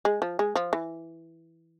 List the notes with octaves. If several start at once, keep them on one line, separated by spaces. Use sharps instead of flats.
G#3
F3
G#3
F3
E3